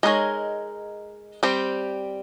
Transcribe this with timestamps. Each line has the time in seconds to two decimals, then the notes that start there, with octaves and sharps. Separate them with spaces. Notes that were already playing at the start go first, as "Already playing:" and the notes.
0.03 G#3 D#4 A#4 C#5
1.43 G3 C4 G4 C5